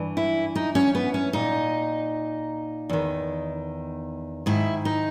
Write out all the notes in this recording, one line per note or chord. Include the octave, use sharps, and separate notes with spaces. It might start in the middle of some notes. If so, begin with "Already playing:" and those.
Already playing: G2 E3
E4
D#4
C#4
B3
C#4
A#2 D#4
E2 D#3
G#2 D#3 E4
D#4